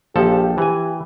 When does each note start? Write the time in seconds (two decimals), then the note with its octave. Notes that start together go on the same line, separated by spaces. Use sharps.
0.16 A#1 F3 G4 A4
0.58 E3 G4 G#5